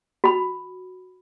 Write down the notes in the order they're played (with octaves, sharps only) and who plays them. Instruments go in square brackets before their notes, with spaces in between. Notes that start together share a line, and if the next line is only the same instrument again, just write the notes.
[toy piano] F#4 B5